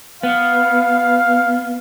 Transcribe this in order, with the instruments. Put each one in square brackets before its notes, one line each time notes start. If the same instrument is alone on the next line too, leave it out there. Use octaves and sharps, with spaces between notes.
[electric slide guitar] B3 [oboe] F5